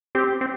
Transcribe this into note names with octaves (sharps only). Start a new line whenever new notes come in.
C4 G4
C4